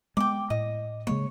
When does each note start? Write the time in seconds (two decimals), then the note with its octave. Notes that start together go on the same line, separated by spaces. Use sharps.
0.17 G#3 B3 G5 D6
0.50 A2 D#5
1.07 C#3 G#3 A#3 C#5